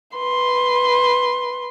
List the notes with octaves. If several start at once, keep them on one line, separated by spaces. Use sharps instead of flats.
B4 C6